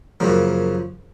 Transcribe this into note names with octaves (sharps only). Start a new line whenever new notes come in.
F#2 C#3 F3 A#3